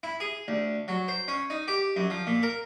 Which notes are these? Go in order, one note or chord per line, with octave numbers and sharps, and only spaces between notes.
E4
G#4
D2
F#3
C5
C#4
D#4
G4
F#2
F3
A#2
A#4